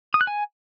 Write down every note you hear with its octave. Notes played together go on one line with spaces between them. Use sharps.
D#6
F#6
G#5